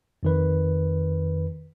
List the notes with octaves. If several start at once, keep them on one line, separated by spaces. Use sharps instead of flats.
F2 D#3 B4